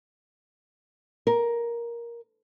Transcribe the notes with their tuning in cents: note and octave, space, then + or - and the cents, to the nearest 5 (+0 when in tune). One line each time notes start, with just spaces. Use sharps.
A#4 +10